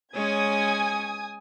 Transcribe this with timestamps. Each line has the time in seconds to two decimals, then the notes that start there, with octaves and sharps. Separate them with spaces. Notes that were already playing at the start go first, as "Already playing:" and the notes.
0.14 G#3 C#4 C#5 G#5 D#6 G#6